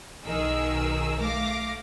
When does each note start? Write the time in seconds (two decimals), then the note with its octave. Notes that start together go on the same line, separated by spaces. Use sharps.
0.25 B1 D#3 G#4 A#4 E6
1.19 A3 F5 D6 A#6